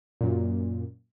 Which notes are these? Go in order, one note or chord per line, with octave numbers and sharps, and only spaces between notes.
F#2 A#2